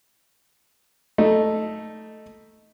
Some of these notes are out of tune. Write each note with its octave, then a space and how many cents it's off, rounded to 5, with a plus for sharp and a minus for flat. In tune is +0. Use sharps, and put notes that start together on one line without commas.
A3 +0 D#4 +5